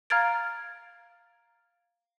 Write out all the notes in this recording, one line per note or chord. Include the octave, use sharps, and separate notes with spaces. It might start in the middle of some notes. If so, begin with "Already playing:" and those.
F5 A#5 F6 G#6 A6 D7